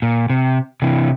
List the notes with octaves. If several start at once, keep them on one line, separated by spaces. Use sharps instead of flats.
A#2
C3
C3 E3